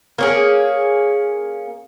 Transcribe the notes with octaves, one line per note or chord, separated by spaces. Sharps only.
A#3 C#4 G#4